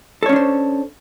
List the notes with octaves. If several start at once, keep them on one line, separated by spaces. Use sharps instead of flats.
C#4 D4 A4 C5 C#5